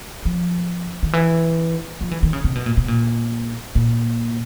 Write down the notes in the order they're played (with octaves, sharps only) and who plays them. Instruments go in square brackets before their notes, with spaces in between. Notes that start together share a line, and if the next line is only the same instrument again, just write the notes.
[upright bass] F3
D#3
E3
F3
E3
D#3
C#3
C3
B2
A#2
B2
A#2
A#2